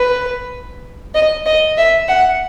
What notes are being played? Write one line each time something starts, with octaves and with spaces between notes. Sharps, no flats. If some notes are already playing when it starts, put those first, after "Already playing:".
Already playing: B4
D#5
D#5
E5
F#5